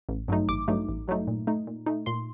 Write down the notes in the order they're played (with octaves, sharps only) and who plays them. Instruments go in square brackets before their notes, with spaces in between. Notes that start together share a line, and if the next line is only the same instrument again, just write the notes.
[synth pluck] A1
G2 F#3 A3 D#4
A1 D6
G2 F#3 A3 D#4
A1
G2 F#3 A3 D#4
A#2
A3 D#4
A#2
A3 D#4
A#2 C6